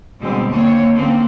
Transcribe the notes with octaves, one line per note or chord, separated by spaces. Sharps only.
B2 D3 G3 G#3 C4
D#2 D3 A#3 C4 C#5
D3 A#3 C4 C#4